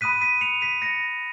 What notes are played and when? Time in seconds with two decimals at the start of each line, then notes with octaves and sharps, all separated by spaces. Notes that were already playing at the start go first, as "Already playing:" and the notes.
0.01 B5 D#6 F#6 B6 D#7
0.21 B6 D#7
0.41 C#7 F7
0.61 B6 D#7
0.82 A#6 C#7